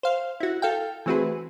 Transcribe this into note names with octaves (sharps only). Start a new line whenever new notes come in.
C5 F5
E4 F#4
A4 F5 G5
E3 A3 C4 F#4 G#4 B4